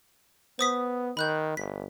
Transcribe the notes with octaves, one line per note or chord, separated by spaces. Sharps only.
B3 C5 D#6 B6
D#3 B5 F#6 G6
G1 B6